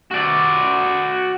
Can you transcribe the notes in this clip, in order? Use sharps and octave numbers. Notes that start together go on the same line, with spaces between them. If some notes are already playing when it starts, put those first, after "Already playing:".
F#4 D5